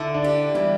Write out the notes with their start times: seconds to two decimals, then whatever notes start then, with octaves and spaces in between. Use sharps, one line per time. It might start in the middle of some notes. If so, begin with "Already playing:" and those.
Already playing: D3 E4
0.14 D4
0.24 G4
0.55 E3 G3